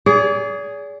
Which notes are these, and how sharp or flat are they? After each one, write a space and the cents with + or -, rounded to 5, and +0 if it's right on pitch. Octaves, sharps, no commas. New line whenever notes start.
G#4 +0 D5 -40